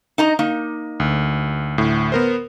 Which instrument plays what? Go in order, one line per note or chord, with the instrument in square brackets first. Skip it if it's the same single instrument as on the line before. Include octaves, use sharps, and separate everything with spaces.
[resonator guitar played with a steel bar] D#4 D#5 A#5
A#3 D#4
[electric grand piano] D2
D2 A2
B3 A#4 C5